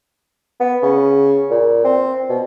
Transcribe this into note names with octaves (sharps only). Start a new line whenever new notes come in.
B3
C#3
A#2
C4
B2